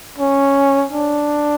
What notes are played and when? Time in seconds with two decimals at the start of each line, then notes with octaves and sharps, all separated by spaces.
0.18 C#4
0.91 D4